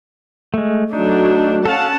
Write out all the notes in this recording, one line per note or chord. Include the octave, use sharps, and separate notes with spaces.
G#3 A3
F#3 A3 D4 D#4
C#4 A4 F5 F#5 A5